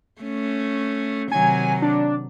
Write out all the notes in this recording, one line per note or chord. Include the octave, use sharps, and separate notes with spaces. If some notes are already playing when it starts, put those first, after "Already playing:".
A3 C#4
C3 D#3 F#3 G#5
D4